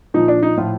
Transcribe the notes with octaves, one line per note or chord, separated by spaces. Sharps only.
A#2 F3 D#4
D4
D#4
A2 F3 F4